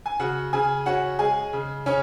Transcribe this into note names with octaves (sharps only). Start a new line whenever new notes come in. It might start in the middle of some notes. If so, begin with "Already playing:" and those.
G#5
C#3 F#4 F#5
C#3 G#4 G#5
C#4 F#4 F#5
G#3 G#4 G#5
C#3
C#3 C#4 C#5